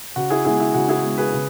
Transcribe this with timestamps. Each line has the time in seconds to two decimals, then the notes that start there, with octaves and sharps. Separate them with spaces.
0.16 C#3 F#4
0.30 E4 G#4
0.45 G#3 B3 E4 G#4
0.60 E4
0.74 C#3 F#4
0.89 E4 G#4
1.03 G#3 B3
1.17 G#4 B4
1.33 C#3